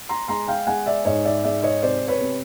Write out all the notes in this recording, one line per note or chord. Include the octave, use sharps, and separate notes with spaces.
A#5 C6
G#3 A#5 C6
F5 G5
G#3 F#5 G#5
D5 E5
G#2 C#5 D#5
D5 E5
G#3 D5 E5
C#5 D#5
C3 C5 D5
B4 C#5
C3